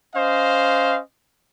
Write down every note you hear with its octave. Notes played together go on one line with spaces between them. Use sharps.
C#4 C5 D#5 F5